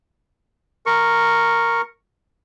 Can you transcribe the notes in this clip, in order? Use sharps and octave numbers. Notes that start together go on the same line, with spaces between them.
A#4 C#6